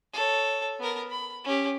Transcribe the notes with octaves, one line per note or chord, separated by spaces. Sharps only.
A4 C#5
B3 A#4
B5
C#4 G4